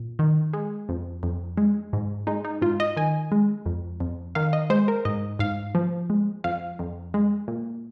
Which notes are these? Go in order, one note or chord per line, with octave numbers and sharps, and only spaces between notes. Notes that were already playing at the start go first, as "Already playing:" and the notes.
Already playing: A#2
D#3
G#3
F2
F2
G#3
G#2
G#3 D#4
D#4
G#2 F4
D#5
D#3 G#5
G#3
F2
F2
D#3 F5
D#5
G#3 C5
A#4
G#2 D#5
G#2 F5
F3
G#3
F2 F5
F2
G#3
A#2